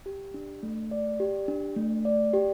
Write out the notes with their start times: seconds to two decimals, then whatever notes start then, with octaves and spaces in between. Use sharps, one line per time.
0.06 G4
0.34 D4
0.63 A3
0.91 D5
1.20 G4
1.48 D4
1.76 A3
2.05 D5
2.34 G4